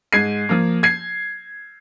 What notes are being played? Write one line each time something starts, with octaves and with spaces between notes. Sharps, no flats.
G#2 G#6 C7
F3 A#3
G#6 C7